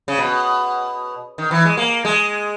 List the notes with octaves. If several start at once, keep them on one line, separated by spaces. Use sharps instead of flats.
C#3
B2
D#3
E3
G#3
A#3
G#3